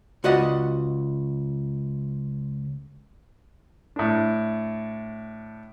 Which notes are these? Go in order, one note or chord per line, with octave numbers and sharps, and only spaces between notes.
C#2 F#4 D5 D#5 F#5
A2 D4